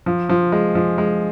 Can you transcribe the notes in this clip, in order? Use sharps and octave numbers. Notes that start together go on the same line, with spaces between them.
F3
F3
G#3
F3
G#3